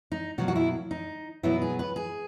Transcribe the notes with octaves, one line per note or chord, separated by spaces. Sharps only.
D#4
B2 F#3 A#3 F#4
F#4
E4
D#4
B2 F#3 B3 E4
G#4
B4
G#4